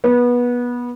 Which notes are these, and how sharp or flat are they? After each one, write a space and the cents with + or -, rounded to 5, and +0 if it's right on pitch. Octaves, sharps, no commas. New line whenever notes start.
B3 -20